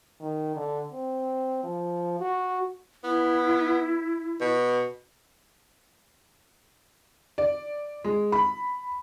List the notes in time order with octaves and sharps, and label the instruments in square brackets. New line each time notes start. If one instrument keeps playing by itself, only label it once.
[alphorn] D#3
D3
C4
F3
F#4
[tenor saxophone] B3 [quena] E4
[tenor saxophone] B2
[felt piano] D5
G#3
B5